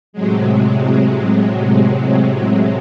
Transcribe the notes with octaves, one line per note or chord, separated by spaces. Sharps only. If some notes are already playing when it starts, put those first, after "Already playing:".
A2 C3 F#3 G#3